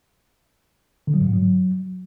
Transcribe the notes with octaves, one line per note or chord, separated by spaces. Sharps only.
D3
F#3
G2
G#2
F#3